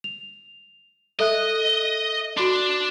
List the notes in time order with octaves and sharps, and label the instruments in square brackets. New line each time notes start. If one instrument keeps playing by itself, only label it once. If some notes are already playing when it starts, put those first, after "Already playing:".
[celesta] F7
[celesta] A4 E5 F#6 [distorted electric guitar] D#5
[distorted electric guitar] D4 [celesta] F#4 C6